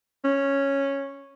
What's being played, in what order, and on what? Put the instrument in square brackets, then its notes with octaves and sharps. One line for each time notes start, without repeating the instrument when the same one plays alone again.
[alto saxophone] C#4